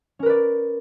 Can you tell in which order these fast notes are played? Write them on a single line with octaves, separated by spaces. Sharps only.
C#4 A#4 B4 D5